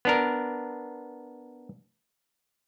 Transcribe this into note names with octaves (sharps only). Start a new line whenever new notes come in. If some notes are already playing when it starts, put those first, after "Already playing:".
B3 D4 A#4